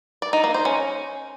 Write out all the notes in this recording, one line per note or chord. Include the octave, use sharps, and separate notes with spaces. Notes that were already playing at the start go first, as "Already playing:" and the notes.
D5
D#4
A#3
C5
C#4